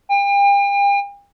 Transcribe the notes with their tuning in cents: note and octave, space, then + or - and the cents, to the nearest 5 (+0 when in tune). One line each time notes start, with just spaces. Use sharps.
G5 +40